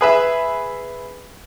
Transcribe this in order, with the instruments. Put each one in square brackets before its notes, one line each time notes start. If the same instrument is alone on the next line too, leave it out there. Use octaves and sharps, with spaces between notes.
[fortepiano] G#4 B4 E5